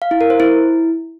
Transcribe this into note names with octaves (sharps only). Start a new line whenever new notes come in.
F5
E4
A#4
C5
E4